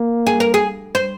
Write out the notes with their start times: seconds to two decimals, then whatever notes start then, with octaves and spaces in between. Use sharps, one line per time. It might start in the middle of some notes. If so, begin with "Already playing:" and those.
Already playing: A#3
0.27 G#4
0.40 A#4
0.54 G#4
0.95 C5